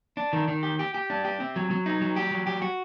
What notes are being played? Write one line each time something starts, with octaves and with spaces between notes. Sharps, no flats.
D4
D#3
D#3
G4
G4
G4
D4
G4
C4
F#3
F#3
D#4
F#3
G4
F#3
G4
F#4